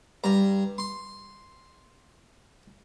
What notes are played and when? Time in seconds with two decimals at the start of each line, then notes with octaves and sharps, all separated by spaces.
0.24 G2 A#5
0.78 C6